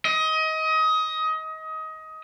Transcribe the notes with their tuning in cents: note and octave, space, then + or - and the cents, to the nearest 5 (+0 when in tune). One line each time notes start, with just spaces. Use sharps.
D#5 +25